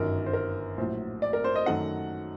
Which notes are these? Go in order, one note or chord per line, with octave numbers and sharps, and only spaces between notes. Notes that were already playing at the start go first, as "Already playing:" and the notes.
Already playing: G1 F#2 D#3 A#4
C5
A#4
A#1 A2 F#3 C5
D5
A#4
C5
D#5
F#2 D#3 F#3 A3 F#5